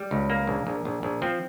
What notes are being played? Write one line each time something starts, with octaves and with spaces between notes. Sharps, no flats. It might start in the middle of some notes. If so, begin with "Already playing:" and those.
Already playing: G3
C#2
A#3
A#1
A#1
A#1
A#1
F3 C4